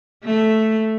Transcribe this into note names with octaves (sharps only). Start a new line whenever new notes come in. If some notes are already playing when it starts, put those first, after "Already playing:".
A3